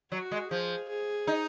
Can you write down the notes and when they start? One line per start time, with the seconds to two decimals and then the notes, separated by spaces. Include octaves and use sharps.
0.12 F#3 F#4
0.31 G#3
0.51 F3 G#4
0.89 G#4
1.27 D#4